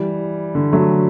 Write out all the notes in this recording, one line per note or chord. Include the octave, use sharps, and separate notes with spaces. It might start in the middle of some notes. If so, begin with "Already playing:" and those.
Already playing: E3 G3
D3
F#3 A3